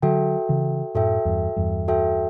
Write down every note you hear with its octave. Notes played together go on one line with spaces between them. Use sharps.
D3 F#3 F#4 A4 E5 G5
C#3 E3
F#2 A2 F#4 A4 E5 G5
E2 G2
E2 G2
F#4 A4 E5 G5